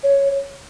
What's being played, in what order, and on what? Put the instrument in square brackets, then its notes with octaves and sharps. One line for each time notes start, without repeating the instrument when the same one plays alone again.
[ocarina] C#5